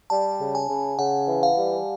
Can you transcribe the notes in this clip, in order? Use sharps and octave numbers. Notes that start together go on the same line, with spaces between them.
G3 A5
C#3
G#5
C#3
C#3 F#5
E3
F5
G3